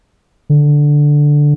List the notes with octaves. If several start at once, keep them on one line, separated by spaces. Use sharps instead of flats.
D3